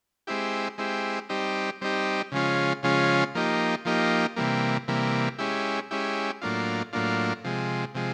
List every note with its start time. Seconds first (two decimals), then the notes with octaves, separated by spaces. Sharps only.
0.27 G#3 C4 E4 G4
0.78 G#3 C4 E4 G4
1.29 G3 C4 D#4 G4
1.81 G3 C4 D#4 G4
2.32 C#3 F3 G#3 C#4 F4
2.83 C#3 F3 G#3 C#4 F4
3.35 F3 A#3 D#4 G4
3.85 F3 A#3 D#4 G4
4.36 C3 E3 G3 A#3
4.88 C3 E3 G3 A#3
5.38 G#3 C#4 E4 G4
5.91 G#3 C#4 E4 G4
6.42 A2 F#3 A#3 D4 F4
6.93 A2 F#3 A#3 D4 F4
7.44 C3 F3 G#3
7.95 C3 F3 G#3